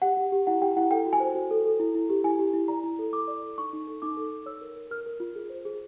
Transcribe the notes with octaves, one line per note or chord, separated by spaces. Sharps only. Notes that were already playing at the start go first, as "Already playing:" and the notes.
G4 F#5
G4
G4
E4 F#5
G4 G5
E4 F#5
A4 G5
F#4
G#5
C5
F#4
A4
A4
E4
E4
G4
E4 G#5
G4
E4
D5 A#5
E4
A4
A4 D6
D5
A4
D#4 C#6
D#4
A4
D#4 D6
A4
D#4
C#5 E6
A#4
A#4
A#4 F6
A#4
F4
G#4
C5
G#4